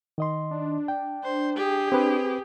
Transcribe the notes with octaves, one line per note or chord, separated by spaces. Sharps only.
D#3 D#5 C6
D4
G5
C5
G4 G#4
C4 B4